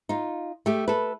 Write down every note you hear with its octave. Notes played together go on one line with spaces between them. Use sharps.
D#4 F4
A3 G4
A4 B4